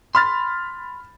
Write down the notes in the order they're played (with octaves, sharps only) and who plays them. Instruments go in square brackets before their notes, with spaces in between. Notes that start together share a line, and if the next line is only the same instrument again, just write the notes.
[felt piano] B5 F6 A6 [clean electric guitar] C6